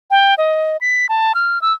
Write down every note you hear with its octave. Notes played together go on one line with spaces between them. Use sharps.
G5
D#5
B6
A5
F6
E6